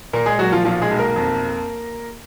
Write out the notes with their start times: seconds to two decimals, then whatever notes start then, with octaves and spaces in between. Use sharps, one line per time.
0.13 A#2 A#3 A#4
0.26 G#3 G#4
0.39 A#2 F#3 F#4
0.52 F3 F4
0.65 B1 F3 F4
0.82 G#3 G#4
0.91 B1
0.99 A#3 A#4
1.16 F2